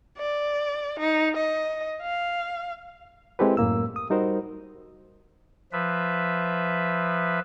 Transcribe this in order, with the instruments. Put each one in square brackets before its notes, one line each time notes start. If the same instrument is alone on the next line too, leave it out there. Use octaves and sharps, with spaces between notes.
[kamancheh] D5
D#4
D#5
F5
[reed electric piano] G#3 C4 E4 G4 A4 B4
F#2 A2 A#3 E6
D#6
G3 D#4 F#4 A#4 C5
[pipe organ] F3 B4 E5